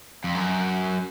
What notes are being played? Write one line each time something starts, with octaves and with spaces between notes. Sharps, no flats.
F2
F#2